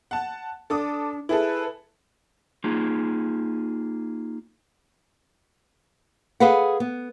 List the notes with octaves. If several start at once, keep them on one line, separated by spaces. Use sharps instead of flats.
F#5 A5
D4 A4 D6 D#6
E4 G#4 A4 B4
A#3 D#4 F4 G#4
G#4 A4 B4 F5 F#5
B3